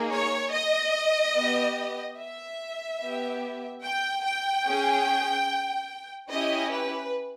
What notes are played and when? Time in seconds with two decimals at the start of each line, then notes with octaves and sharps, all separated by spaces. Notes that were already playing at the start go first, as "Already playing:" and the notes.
Already playing: A#3 D#4 G#4
0.12 C#5
0.52 D#5
1.35 B3 G4
2.17 E5
3.00 B3 G4
3.83 G5
4.24 G5
4.66 C#4 G#4
6.30 C#4 E4 G4 D#5
6.71 B4